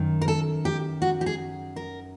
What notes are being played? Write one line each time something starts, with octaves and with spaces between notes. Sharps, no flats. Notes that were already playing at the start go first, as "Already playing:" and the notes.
Already playing: F#2 D#3
A#4
A4
G4
F#4
G4
G#4
A#4